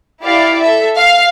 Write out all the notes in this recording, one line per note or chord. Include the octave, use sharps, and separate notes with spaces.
E4 G4 D5 F5
A4 E5
F5